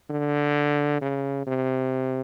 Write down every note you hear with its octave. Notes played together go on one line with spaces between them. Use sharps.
D3
C#3
C3